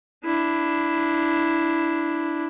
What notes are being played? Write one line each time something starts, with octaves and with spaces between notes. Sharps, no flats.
D4 E4